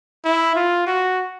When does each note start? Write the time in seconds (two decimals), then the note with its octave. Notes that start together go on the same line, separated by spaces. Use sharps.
0.25 E4
0.56 F4
0.87 F#4